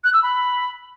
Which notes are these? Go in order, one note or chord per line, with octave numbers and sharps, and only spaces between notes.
F#6
E6
B5